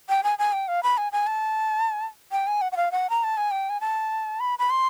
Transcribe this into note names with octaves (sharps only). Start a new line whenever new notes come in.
G5
G#5
G#5
G5
F5
B5
G#5
G#5
A5
G5
G#5
F#5
F#5
F5
F#5
A#5
A5
G#5
G5
G#5
A5
B5
B5
C6